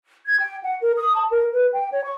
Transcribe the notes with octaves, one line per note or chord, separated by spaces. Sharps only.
G#6
G5
F#5
A#4
D#6
A5
A#4
B4
G5
C#5
C#6